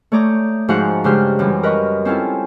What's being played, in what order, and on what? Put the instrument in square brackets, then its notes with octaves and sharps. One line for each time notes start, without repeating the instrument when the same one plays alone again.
[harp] A3 C#5 D5 A#5 D#6 G6
G#2 F3 F#4 F5 F#5 A#5
G2 C#3 G#3 G4 C5 F6
F#2 E3 G3
A#4 B4 D#5 C6 C#6
C4 C#4 E4 F4 A4